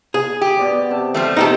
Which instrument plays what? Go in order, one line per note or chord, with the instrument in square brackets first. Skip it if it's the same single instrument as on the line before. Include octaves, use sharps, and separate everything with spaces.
[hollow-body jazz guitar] G#4
[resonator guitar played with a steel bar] G4
[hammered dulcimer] B2 D5 D6
C3 A5
[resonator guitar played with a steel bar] F3 G3 A3
[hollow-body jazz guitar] D#4 G4 A4